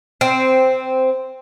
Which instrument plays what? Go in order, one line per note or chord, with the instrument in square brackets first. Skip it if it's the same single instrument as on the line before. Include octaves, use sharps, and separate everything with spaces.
[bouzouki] C4